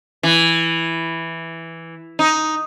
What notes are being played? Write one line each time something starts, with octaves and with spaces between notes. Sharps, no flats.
E3
D#4